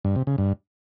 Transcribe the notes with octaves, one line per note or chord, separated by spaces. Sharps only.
G2
C3
C#3
G2